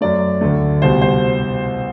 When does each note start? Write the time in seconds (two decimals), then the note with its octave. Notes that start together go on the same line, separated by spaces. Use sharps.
0.01 F#2 F#3 A3 D5
0.41 D2 D3 A3
0.82 C2 B2 G3 C5
1.02 C5